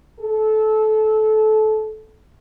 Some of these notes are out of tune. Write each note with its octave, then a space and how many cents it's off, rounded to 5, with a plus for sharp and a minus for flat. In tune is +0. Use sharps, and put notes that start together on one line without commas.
A4 -20